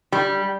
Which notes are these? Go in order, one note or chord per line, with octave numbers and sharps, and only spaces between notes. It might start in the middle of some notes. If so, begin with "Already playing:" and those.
G3